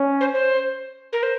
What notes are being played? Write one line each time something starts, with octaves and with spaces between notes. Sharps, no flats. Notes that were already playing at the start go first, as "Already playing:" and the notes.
Already playing: C#4
C5
C5
A#4
C5